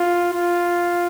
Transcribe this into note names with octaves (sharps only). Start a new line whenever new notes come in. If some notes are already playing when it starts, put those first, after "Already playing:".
Already playing: F4
F4